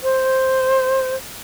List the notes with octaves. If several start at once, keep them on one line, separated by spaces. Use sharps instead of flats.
C5